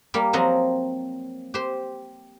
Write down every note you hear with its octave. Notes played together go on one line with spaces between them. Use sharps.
G3 A#3
F3 F#3 C4 D#5
G4 C5